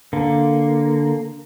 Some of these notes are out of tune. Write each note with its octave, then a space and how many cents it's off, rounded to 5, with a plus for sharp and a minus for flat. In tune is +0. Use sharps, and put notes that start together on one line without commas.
D3 +0 A#3 +0